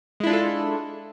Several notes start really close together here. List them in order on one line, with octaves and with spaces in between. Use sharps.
G#3 E4 D4 F4 A4